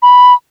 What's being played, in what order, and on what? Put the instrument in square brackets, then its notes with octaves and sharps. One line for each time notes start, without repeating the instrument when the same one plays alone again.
[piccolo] B5